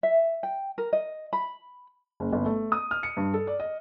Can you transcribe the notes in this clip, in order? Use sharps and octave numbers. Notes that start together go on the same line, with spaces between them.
E5
G5
A#4
D#5
B5
F#1
G1
A3
D#6
F6
C#7
G2
A4
D5
D#5